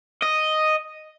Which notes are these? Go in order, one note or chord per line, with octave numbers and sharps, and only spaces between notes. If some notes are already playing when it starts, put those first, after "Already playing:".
D#5